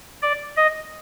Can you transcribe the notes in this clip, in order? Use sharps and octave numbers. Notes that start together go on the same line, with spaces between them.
D5
D#5